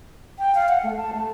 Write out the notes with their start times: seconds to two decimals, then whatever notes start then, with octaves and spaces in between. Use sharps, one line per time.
0.39 G5
0.55 F5
0.69 F#5
0.83 A3
0.97 A5
1.13 A3